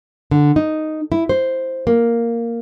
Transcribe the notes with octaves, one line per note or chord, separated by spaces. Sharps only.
D3
D#4
E4
C5
A#3